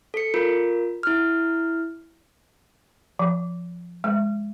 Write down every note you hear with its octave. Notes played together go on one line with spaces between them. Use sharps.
A4 C#7
F4 A#4
E4 F6
F3
G#3